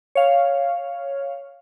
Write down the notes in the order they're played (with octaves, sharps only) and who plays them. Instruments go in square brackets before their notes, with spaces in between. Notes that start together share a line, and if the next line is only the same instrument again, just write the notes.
[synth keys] C#5 F5